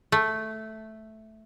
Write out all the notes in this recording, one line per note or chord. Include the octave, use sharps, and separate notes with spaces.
A3